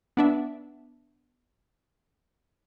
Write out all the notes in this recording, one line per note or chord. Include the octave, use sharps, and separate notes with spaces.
B3 D4 E5